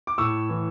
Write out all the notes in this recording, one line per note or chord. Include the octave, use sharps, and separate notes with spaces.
D6
A2 C#6 E6
E3